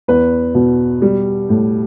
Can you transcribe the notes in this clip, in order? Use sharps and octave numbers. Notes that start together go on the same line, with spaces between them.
E2 B4
B2
G3
A2